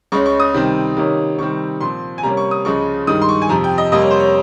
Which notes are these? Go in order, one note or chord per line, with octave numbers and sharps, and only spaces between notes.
C#2 C#3 G#3 C#4 C#6
C#6
D#6
C3 D#3 G3 C4
C3 D#3 A#3 C#4
C3 D#3 G3 C4 C#6
A#2 F3 C4 C6
G#5
C3 G3 A#3 C#4 A#5
C#6
D#6
C#2 C#3 F3 G#3 C#6
G2 D#3 G#3 D#6
C6
C#6
G#5
F2 C3 F3 A#5
G5
D#5
F2 C3 G3 A#3 D#5
C#5
C5
C#5